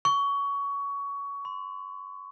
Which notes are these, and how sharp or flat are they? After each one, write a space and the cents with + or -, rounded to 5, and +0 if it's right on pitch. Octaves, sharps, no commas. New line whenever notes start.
C#6 +20
C6 -30